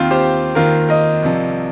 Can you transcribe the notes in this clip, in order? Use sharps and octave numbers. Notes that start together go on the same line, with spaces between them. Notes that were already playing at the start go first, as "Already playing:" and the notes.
Already playing: D#2 D#3 C4 F4
G4 C5
D#2 D#3 F4 A#4
A#4 D#5
C2 C3 F3